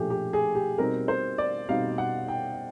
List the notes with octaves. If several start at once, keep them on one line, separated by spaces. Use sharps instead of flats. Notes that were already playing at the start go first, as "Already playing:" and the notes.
Already playing: A#2 F3 A3 D4 G4 G#4
G4
G#4
G4
B2 G3 C4 D#4 A#4
C5
D5
B2 G3 C4 D#4 F5
F#5
G5